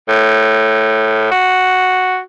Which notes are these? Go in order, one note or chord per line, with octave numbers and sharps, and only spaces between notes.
A2
F#4